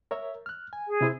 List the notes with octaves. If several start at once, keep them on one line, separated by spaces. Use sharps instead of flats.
A#4 C#5 E5
F6 F#6
G#5
G#4
C3 E4 C5